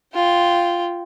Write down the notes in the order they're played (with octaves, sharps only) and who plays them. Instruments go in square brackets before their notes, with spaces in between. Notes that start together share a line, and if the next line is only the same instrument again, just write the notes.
[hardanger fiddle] F4 G5